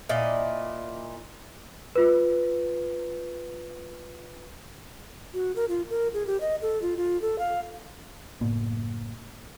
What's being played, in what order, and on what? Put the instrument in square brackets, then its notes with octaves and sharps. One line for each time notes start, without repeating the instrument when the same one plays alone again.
[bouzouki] A#2 E4 D5 D#5
[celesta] F4 B4
[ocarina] F#4
A#4
F4
A#4
G#4
G4
D#5
A4
F4
F4
A4
F5
[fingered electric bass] F#1 A2 A#3 B3